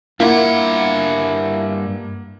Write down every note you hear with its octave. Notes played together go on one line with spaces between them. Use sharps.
G2 A#3 E4 F4 F#5